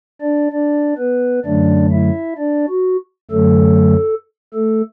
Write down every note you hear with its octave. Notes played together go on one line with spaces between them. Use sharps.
D4 D5
D4 D5
B3 B4
F#2 D3 F#3 A3 D4 D5
E4 E5
D4 D5
F#4
F#2 D3 F#3 A3 A4
A3 A4